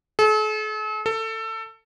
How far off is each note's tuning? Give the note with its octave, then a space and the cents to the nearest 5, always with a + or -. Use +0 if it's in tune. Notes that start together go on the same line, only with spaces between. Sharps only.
A4 -45
A4 +20